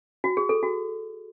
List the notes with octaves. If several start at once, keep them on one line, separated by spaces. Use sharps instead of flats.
F#4
G#4
A4
F#4